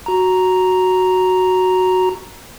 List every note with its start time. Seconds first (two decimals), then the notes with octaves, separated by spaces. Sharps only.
0.06 F#4 A#5